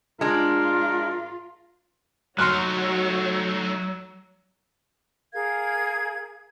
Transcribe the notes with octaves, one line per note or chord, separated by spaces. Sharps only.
G#3 D4 F4 A#4
F#3 A3 D#4 F#4 C#5 C6 F6 F#6
G#4 A#4 F5 G#6